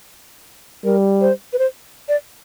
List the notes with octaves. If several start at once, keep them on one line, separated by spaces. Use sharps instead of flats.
G3 A#4
C5
B4
C5
D5